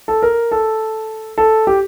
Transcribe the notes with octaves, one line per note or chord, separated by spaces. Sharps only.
A4
A#4
A4
A4
G4